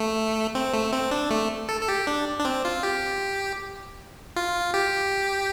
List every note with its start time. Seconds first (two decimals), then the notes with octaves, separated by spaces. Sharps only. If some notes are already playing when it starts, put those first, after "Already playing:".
Already playing: A3
0.55 C4
0.74 A3
0.92 C4
1.11 D4
1.30 A3
1.69 A4
1.81 A4
1.88 G4
2.07 D4
2.40 D4
2.45 C4
2.65 F4
2.83 G4
4.36 F4
4.74 G4